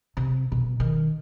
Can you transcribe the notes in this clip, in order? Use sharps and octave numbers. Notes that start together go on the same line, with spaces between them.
C3
B2
D#3